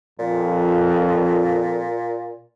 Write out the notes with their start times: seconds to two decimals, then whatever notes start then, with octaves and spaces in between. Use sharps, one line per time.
0.19 F2 A#2